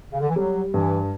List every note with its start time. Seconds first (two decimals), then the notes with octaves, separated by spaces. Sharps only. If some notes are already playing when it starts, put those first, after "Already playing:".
0.12 C#3
0.20 D3
0.29 E3
0.36 F#3 G3
0.74 G2 E3